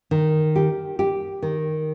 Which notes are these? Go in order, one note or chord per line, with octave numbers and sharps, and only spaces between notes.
D#3
G4
G4
D#3